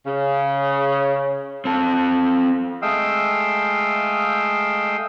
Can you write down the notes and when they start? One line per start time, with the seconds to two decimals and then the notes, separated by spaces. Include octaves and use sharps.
0.06 C#3
1.65 C4 A4
2.82 G#3 A3 F5 G5 D#6 E6